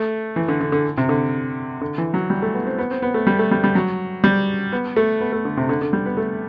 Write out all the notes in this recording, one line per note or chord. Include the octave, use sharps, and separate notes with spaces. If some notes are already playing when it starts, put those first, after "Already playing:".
Already playing: A3
E3
D3
D3
D3
C3
D3
D3
E3
F#3
G3
A3
B3
C4
B3
C4
B3
A3
G3
A3
G3
G3
F#3
G3
B3
A3
B3
A3
D3
C3
D3
D3
G3
B3
A3